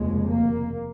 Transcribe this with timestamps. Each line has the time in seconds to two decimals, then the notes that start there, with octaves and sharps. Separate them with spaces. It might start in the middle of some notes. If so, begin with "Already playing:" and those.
Already playing: F1 D#2 C#3 G#3
0.29 A#3